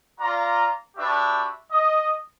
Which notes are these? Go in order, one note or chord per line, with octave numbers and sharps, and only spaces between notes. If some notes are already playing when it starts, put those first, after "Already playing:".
F4 D5 A#5
D4 F#4 G4 B4 E5
D#5